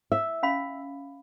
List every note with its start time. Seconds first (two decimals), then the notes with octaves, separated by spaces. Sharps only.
0.12 E5
0.43 C#4 F5 B5